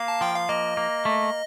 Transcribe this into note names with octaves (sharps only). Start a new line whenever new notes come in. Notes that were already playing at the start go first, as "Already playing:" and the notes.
Already playing: A#3 F5
A5
F3 G5
F5
A#3 D#5
A#3
A3